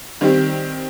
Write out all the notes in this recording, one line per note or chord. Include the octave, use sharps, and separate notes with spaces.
D#3 G3 C4 G4